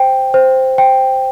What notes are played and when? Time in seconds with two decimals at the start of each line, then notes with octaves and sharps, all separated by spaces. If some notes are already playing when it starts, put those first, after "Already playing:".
Already playing: C5 G5
0.34 C5
0.78 G5